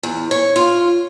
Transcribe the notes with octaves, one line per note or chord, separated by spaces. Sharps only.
E2
C#5
F4